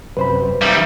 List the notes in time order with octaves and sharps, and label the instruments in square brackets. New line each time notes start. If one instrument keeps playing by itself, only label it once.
[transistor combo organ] F#2 C3 [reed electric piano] B4 C5 B5
[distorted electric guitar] D#3 G3 [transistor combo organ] E5 F5